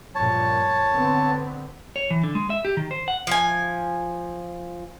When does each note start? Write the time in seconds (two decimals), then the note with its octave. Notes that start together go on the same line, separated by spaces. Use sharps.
0.15 G2 A#2 F3 C#5 A5
0.94 D3 B3 C4
1.96 C#5
2.11 E3
2.24 D3
2.35 G#3
2.50 E5
2.65 G4
2.77 D#3
2.91 C5
3.08 F#5
3.27 F3 G#5